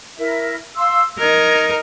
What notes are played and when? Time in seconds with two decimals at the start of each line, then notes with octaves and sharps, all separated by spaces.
0.17 E4 A#4 E5
0.76 F5 C6 E6
1.18 D#4 A#4 G#6